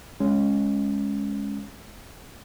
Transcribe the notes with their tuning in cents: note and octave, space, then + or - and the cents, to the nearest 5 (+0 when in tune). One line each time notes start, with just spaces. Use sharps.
G#3 +0 C#4 +0 C#5 +0